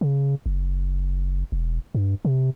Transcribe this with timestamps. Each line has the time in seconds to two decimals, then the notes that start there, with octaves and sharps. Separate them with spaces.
0.01 C#3
0.46 F#1
1.52 E1
1.95 G2
2.25 C3